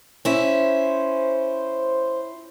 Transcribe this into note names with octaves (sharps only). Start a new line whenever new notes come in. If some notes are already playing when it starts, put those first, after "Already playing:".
C#4 E4 C5